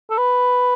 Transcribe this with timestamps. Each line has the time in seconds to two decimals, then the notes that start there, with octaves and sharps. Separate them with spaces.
0.10 A4
0.18 B4